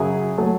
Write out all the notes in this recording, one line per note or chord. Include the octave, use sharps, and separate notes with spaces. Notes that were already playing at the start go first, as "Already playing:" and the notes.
Already playing: F#2 C#3 F#3 G#4
F#3 A3